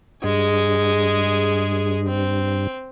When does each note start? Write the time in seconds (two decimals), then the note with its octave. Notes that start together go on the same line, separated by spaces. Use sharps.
0.24 G2 G#3 G#4
2.07 C4